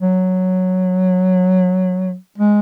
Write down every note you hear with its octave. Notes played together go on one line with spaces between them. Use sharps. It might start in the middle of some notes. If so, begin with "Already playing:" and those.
F#3
G#3